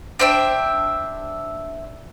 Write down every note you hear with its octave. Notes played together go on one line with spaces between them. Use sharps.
D4 C5 E5 G5